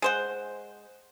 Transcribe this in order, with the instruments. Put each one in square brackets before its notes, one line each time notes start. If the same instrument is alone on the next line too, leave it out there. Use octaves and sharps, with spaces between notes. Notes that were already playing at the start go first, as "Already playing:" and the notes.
[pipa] G#3 C5 F#5